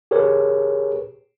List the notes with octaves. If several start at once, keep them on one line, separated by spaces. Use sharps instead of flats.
G4 G#4 A#4 B4 C#5